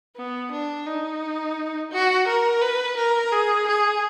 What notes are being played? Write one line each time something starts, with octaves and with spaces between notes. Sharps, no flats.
B3
D4
D#4
F#4
A#4
B4
A#4
G#4
G#4